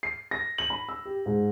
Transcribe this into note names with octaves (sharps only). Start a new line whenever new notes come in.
C7
A#6
F#7
B5
E6
G4
G#2